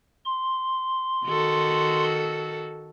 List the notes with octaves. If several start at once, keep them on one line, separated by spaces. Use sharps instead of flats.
C6
D#3 F#4 A4